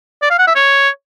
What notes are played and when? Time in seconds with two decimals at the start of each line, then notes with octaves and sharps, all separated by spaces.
0.22 D5
0.30 F5
0.39 F#5
0.47 E5
0.56 C#5